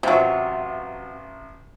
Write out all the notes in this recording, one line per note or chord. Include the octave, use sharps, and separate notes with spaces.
A1 C3 F#3 F4 C#6